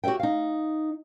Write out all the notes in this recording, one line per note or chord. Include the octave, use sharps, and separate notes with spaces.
F#4 G4 C5 E5 G5
D#4 F5